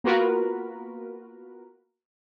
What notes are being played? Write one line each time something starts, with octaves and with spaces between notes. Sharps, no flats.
A#3 B3 F4 F#4 A#4 B4